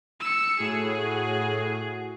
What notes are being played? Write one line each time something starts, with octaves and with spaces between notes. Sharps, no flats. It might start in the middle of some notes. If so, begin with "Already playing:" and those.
E6 C#7
A2 F#4 G#4